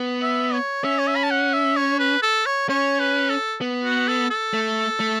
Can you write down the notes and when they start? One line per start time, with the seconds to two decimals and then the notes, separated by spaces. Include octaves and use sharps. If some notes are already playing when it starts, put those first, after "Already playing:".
Already playing: B3
0.22 E5
0.53 C#5
0.84 C#4 E5
0.99 C#5
1.07 E5
1.16 B5
1.24 A5
1.31 F#5
1.54 E5
1.77 C#5
1.99 B4
2.23 A4
2.46 C#5
2.69 C#4 C#5
2.99 B4
3.30 A4
3.61 B3
3.85 F#4
4.08 A4
4.30 A4
4.54 A3
5.00 A3